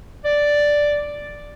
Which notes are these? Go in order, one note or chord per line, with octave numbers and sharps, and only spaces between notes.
D5